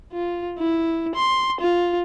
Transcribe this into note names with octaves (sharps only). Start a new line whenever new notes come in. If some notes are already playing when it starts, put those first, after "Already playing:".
F4
E4
C6
F4